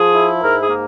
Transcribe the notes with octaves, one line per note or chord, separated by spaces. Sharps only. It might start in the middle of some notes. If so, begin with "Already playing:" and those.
Already playing: F3 G#4
E4
G#2 A#4
G#4
A#3